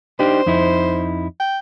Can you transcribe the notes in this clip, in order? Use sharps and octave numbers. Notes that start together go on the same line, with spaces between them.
D4 D#4 G4 C5
F2 D#4 E4
G5